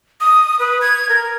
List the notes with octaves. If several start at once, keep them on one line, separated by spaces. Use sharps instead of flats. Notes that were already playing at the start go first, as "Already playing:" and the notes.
D#6
B4
G#6
A#4